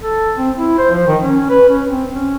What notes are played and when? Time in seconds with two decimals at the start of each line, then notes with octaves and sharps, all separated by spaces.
0.02 A4
0.37 C4
0.57 E4
0.78 C5
0.91 F3
1.07 D#3
1.22 C#4
1.49 B4
1.68 C#4
1.88 C4
2.15 C#4